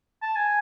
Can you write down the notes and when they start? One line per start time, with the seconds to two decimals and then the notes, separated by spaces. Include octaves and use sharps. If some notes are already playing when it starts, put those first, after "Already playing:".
0.22 A5
0.36 G#5